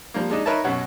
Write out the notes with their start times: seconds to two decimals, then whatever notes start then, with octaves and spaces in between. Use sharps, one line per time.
0.14 F3 G3 A#3
0.30 G#3 D4 D#4
0.46 D#4 A#4 B4 C#5 E5 A5
0.64 F#2 B2 F#4 C#5